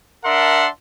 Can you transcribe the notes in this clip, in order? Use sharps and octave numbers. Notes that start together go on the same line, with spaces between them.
D4 A#4 E5 F#5 A5 C6